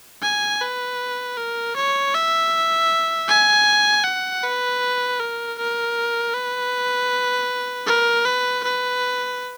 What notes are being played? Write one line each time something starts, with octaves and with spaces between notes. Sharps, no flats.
G#5
B4
A#4
C#5
E5
G#5
F#5
B4
A#4
A#4
B4
A#4
B4
B4